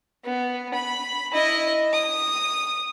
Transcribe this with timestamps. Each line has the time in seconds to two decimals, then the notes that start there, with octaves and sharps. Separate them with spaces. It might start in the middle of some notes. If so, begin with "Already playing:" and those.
0.24 B3
0.74 B5
1.32 E4 D#5
1.93 D#6